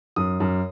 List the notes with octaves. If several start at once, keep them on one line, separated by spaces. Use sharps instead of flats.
F#2 D#6
F#2